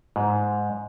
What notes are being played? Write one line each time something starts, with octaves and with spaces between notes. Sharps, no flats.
G#2